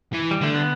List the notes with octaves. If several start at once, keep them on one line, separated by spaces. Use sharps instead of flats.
E3
G3
D3 A3
B3